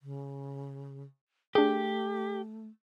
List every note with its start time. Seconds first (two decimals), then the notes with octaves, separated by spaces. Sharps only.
0.02 C#3
1.55 A3 D4 G4 G#4